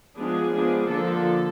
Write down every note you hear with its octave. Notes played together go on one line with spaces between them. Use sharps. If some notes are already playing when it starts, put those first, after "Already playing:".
F3 G#3 B3 D4 G#4
F3 G#3 B3 D4
D3 F3 A#3 D4 A4